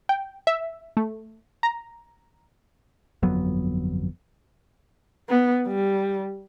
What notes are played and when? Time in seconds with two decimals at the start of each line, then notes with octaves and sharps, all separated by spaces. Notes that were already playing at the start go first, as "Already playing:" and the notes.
0.09 G5
0.47 E5
0.97 A3
1.63 A#5
3.23 G1 F2 F#3 B3
5.29 B3
5.67 G3